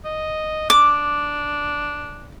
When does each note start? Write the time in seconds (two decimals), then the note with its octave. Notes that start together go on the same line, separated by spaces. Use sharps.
0.05 D#5
0.70 D4 D6